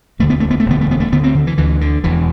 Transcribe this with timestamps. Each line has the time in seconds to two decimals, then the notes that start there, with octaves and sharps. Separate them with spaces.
0.19 E1 D2 D3 A3
0.30 B3
0.40 A3
0.50 B3
0.60 A3
0.66 E1 D2 D3 B3
0.81 A3
0.91 B3
1.00 A3
1.12 D2 D3 B3
1.24 C4
1.35 D3
1.47 E3
1.58 D2 D3 E3
1.81 D3
2.04 E1 E2 B2 E3